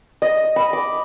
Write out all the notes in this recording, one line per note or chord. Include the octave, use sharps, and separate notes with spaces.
D#5
B5
D6